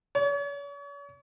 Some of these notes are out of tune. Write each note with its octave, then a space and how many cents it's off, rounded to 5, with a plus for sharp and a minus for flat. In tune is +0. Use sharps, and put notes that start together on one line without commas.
C#5 +40